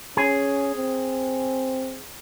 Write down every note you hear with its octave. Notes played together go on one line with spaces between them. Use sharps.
C#4 G#4
C4